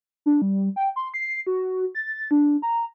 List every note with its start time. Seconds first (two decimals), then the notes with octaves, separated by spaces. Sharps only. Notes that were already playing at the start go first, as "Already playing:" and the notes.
0.26 D4
0.42 G3
0.76 G5
0.96 C6
1.14 C7
1.47 F#4
1.95 A6
2.31 D4
2.62 A#5